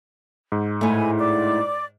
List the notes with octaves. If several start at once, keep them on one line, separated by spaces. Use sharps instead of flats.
G#2
A2 A3 G#5 B5
D5 D6